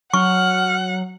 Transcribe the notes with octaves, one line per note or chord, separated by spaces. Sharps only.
F#3 F#5 C#6 F6